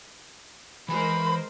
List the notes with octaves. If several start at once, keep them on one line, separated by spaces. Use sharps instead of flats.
E3 G#3 A#4 C5 G#5 B5